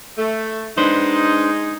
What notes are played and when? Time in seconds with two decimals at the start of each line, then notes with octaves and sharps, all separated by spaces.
0.18 A3
0.78 G#3 D4 D#4 B4 C5